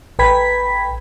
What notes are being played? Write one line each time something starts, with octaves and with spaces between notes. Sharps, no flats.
A1 B4 G5 B5 G#6 B6